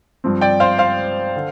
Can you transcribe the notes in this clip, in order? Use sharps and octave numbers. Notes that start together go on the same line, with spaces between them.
G2 F3 C4
D5 G5
C5 F5
C5 F5
D3